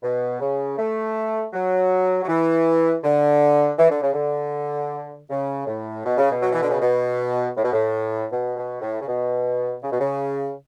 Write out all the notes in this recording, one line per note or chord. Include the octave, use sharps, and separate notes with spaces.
B2
C#3
A3
F#3
F#3
E3
D3
E3
D3
C#3
D3
C#3
A2
B2
C#3
B2
F#3
E3
D3
C#3
B2
A2
B2
A2
B2
B2
A2
C#3
B2
C#3
B2
C#3